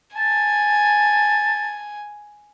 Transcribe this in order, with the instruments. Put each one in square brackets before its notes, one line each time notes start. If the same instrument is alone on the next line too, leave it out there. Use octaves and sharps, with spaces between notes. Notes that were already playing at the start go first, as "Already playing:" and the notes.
[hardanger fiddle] G#5 [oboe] A5